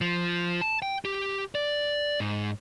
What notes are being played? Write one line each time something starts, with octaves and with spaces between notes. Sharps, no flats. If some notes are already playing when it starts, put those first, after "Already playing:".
F3
A5
G5
G4
D5
G#2